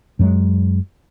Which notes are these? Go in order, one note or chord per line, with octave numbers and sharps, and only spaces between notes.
F#2 F#3 G#3